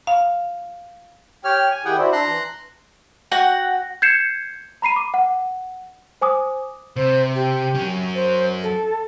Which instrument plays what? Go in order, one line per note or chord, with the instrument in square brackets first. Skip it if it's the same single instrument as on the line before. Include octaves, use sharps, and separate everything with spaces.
[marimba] F5
[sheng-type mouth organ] G4 C#5 F6 [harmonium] G5
[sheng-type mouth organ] G#5
[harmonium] D#3 E4 G4 [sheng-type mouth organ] G#4 F#5 G5
[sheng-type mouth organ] E4 [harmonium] F#4 C5 D5
[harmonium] D4 A5 [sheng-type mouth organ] A#5 C6 F#6
[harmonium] E3
[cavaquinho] F#4 F#5 G5
[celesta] G6 G#6 C7 C#7 E7
A#5 B5 C7 D#7
D6
F#5
C5 G#5 D6 D#6
[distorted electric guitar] C3 [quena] C5
[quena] G4
[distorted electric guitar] F#3 C#4
[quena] C5
A4